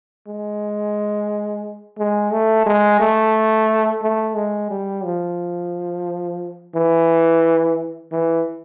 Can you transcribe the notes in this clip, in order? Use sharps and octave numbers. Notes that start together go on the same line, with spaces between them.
G#3
G#3
A3
G#3
A3
A3
G#3
G3
F3
E3
E3